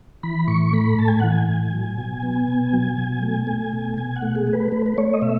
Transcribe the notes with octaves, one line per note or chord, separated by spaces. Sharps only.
E3 B5
A2 C#6
A3 B5
A2 A5
G#5
E3 F#5
G#5
A2
F#3
B2
B3
B2
F#3
B2
A3
A3
B2
B2 G#5
F#5
A3
G#4
A3
B4
A3 B4
B4
A3 C#5
D#5
B2 E5